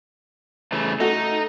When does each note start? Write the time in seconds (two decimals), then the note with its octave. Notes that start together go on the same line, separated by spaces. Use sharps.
0.72 C#3 E3 A3
1.00 A3 D#4 F#4 A4